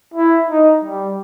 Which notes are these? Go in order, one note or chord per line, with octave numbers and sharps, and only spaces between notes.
E4
D#4
G3